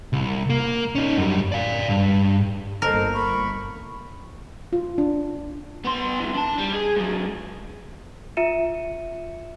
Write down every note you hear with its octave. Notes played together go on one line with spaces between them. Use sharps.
C2
A#3
C#4 D#4
F#2 G3
D5 F5
G2
G1 A#3 A4 A#4 C5 D#5
B5 C#6
F4
D4
B3 C6
G2 E3
D4 A5
G3
G#4
G#2 F#3
F4 E5 C#7 D#7 E7